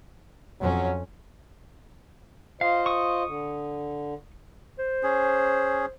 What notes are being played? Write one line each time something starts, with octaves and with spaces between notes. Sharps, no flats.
F2 F#3 C#4
F4 C5 D#5 F5
C#6 D#6
D3
C5
C#4 G#4